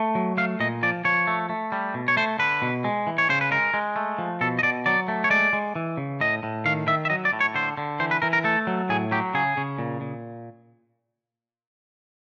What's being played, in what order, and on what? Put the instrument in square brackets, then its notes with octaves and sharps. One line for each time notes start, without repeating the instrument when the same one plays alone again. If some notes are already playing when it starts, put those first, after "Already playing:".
Already playing: [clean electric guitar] A3
F#3
A3 F5
A#2 D#5
F3 D5
F3 C#5
A3
A3
G3
B2
C#5
A3 C5
D3 B4
B2
G#3
E3
C#5
C#3 C5
B4
G#3 A#4
G#3
A3
F3
B2 A4
D#5
B2 D5
F#3 D5
A3
C#5
G#3 D5
G#3
E3
C#3
A2 D#5
A2
D#3 F5
D#3 E5
E5
F#3 D#5
D5
A2
C#5
D3 C5
D3
E3 C5
B4
E3 A#4
A#4
A3 A4
F#3
A2 G#4
F#3 G4
C#3 G#4
C#3
A#2
A#2